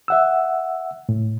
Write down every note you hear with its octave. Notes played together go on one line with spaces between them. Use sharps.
E5 F#5 E6
A2